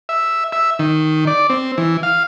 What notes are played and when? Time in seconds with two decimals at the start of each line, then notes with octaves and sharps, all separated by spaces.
0.09 E5
0.52 E5
0.79 D#3
1.27 D5
1.50 C4
1.78 E3
2.03 F5